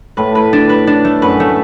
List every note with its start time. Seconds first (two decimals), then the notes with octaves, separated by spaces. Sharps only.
0.17 A2 B4
0.35 B4
0.53 D4
0.69 B4
0.87 D4
1.05 A3
1.22 F#2 B4
1.40 A3